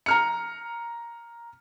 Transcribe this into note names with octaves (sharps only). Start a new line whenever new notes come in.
A#5 F6 C#7